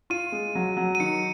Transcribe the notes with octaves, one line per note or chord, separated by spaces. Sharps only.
F4 D#7
G#3
F#3
F#3
D#7
D#3 C#7